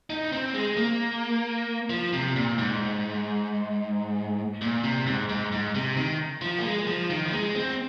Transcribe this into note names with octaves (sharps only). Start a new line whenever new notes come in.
D#4
C4
G#3
A#3
F3
C3
A#2
G#2
A#2
C3
G#2
G#2
G#2
C3
D#3
F3
A#3
G#3
F3
D#3
F3
G#3
C4